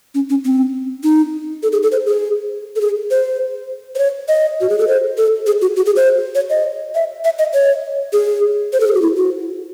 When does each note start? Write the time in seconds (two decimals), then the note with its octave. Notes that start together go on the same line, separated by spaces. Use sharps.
0.15 C#4
0.30 C#4
0.45 C4
1.04 D#4
1.63 A4
1.72 G#4
1.83 A4
1.92 C5
2.06 G#4
2.76 A4
2.81 G#4
3.11 C5
3.95 C5
3.99 C#5
4.28 D#5
4.61 F#4
4.69 G#4
4.79 A4
4.88 C5
5.18 A4
5.47 G#4
5.61 F#4
5.76 F#4
5.86 G#4
5.96 C5
6.35 C#5
6.50 D#5
6.95 E5
7.24 E5
7.39 D#5
7.54 C#5
8.13 G#4
8.73 C5
8.80 A4
8.87 G#4
8.94 F#4
9.02 E4
9.17 F#4